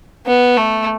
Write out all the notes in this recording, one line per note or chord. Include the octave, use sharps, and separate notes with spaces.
B3
A3